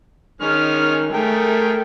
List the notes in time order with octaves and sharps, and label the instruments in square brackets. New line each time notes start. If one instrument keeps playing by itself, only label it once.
[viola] D#3 [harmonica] G#3 C#4 F6
[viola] A3 [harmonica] G#4 A#4 G5